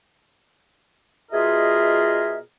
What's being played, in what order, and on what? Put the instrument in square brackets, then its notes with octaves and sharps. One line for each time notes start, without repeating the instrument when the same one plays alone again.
[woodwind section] B2 F4 G#4 A#4 D#5 E5